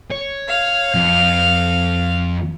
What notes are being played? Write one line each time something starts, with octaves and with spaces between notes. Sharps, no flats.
C#5
F5
F2